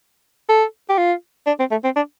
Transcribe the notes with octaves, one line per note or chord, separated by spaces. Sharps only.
A4
G4
F4
D4
C4
A3
C4
D4